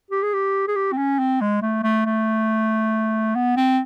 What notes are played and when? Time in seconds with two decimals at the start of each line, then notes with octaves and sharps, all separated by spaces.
0.11 G4
0.23 G#4
0.33 G4
0.68 G#4
0.76 G4
0.92 C4
0.98 C#4
1.19 C4
1.41 G#3
1.62 A3
1.83 A3
2.06 A3
3.35 B3
3.57 C4